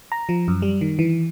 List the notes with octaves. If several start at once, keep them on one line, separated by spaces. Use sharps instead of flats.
A#5
F3
F#2
G3
D#3
E3